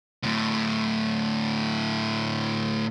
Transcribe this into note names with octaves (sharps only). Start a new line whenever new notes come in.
D2 A2